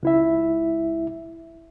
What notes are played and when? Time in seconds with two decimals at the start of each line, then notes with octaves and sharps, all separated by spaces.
0.03 C#2 E4 E5